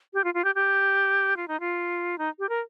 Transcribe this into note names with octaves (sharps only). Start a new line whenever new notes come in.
G4
F4
F4
G4
G4
F4
D#4
F4
D#4
G4
A#4